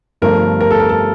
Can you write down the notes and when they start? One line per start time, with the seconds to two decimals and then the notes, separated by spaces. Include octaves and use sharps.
0.22 G1 G2 F3 A3 A#4
0.61 A#4
0.71 A4
0.80 A#4
0.89 A4